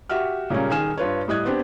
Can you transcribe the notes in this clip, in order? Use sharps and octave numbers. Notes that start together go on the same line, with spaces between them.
F#4 G4 E5 F#5 F6
A#2 C#3 G3 G#3 A#3 C#4
D#1 D#3 G#4 G#5 F6 E7
G2 F4 B4 C#5
A2 G3 D#5 D#6 F#6 G#6
B3 C4 D4 G4